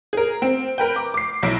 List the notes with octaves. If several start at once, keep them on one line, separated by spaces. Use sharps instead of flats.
G#4 A#4
C4
A#4 B4 G5
D6
D6 C7
B1 E4 E5 D7